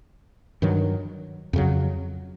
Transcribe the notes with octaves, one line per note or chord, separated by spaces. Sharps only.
G2 D#3 F#3
F2 C#3 F#3